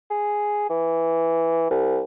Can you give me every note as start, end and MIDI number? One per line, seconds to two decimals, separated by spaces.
0.10 0.68 68
0.69 1.66 52
1.71 2.01 36